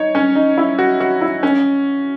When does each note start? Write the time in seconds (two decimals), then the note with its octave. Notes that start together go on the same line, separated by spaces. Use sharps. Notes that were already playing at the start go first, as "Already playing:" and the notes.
Already playing: D#4 C#5
0.15 C#4
0.35 D#4
0.58 E4
0.79 F#4
1.00 F#4
1.21 E4
1.43 C#4